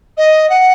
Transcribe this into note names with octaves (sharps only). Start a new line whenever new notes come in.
D#5
F#5